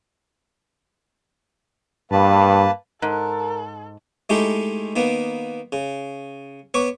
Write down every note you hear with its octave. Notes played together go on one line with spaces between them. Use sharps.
G2 A#3 B4 A5
G#2 A4 A#4
G#3 A3 D#4 E4 G4
D#3 A#3 B3
C#3
B3 C#5 C#6 D6